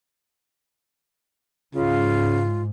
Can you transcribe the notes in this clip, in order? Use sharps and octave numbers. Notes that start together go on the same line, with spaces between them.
G#2 C#3 F4